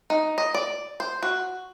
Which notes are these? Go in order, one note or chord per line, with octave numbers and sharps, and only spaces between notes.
D#4
D#5
D5
C5
F#4